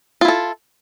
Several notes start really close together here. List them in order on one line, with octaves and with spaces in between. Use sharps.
F4 E4 A4